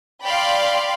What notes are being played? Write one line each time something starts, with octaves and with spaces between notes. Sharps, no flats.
D5 F5 G5 B5 C6